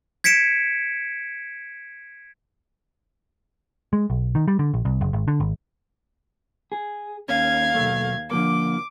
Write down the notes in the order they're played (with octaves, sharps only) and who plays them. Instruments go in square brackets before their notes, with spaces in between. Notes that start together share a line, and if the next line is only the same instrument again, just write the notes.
[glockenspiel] G#6 B6 C#7 D7 E7
[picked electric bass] G#3
B1
D#3
G3
D3
A#1
C2
F#1
G#1
D3
G#1
[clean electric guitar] G#4
[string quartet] D#2 F5 G#6 [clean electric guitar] C#4
[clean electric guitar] B1 A3
[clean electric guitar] D3 F3 A#3 [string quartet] D6